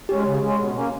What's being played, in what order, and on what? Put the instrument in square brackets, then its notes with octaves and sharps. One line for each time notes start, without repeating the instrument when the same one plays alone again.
[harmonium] G#3 C#4 [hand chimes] G4
[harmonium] C#3
G#3 C#4
B2
A#3 C#4